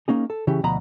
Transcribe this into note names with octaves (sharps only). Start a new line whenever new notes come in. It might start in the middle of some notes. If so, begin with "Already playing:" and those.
A#3 C#4 D#4 G#4
A4
C#3 E3 C#4 G4
D2 B2 F3 D#5 A#5 B5